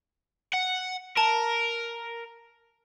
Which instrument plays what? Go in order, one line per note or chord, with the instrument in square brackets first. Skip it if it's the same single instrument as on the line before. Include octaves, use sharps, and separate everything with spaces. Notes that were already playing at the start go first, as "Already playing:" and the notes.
[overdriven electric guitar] F#5
[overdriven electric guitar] A#4 [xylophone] A5